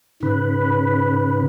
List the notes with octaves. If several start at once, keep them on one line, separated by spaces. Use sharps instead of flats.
G#2 C#3 B4